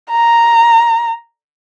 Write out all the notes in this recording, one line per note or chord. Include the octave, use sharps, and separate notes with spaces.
A#5